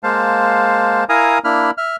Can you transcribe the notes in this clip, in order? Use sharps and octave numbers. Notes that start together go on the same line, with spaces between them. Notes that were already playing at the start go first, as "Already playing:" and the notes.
G#3 A#3 C5 F5 A5
E4 A#4 F5 G#5 A#5 D#6
A#3 D4 E4 B5 F6
E5 F6